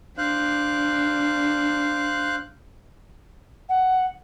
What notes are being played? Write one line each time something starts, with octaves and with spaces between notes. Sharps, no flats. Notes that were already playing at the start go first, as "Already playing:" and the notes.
D4 C5 F5 F#6
F#5